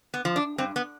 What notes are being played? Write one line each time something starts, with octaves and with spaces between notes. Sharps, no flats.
B3
F3
D4
G2 C4
B3